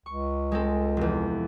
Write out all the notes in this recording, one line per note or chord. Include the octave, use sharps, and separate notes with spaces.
C#2 C#6
G#3 C4 A4
F1 E2